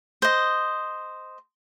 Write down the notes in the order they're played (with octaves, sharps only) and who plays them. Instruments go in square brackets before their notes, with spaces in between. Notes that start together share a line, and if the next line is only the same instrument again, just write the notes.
[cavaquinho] C5 D#5